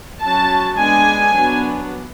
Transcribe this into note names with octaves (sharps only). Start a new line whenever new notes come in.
F#3 C#4 A5
G#3 B3 D4 G#5
F#3 B3 D4